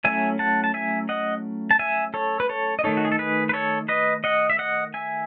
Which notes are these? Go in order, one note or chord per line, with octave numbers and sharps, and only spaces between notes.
F#3 A3 C#4 E4 E5 G#5
F#5 A5
A5
E5 G#5
D#5 F#5
A5
E5 G#5
A4 C#5
B4
A4 C#5
D#5
D#3 A3 D#4 A4 C#5
F#4
G#4
A4
G#4 B4
B4
A4 C#5
B4 D#5
D#5 F#5
E5
D#5 F#5
E5 G#5